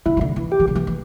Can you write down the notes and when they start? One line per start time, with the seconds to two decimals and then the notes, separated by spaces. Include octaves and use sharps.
0.06 D3 E4
0.17 E3
0.21 D3
0.36 E3
0.52 G4
0.60 E3
0.67 D3
0.75 E3
0.87 E3